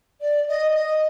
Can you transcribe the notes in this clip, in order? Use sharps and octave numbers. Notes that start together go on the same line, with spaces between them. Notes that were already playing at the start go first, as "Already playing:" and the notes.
D5
D#5
D#5